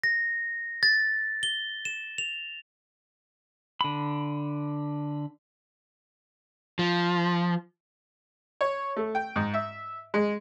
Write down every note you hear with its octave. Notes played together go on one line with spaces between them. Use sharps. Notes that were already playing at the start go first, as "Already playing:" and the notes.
A#6
A6
G7
E7
F7
D3 B5
F3
C#5
A3
G5
G#2
E5
G#3